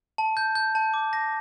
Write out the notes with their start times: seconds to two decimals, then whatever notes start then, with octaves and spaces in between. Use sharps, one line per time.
0.18 A5
0.37 G6
0.55 G6
0.75 A5
0.94 D6
1.13 A#6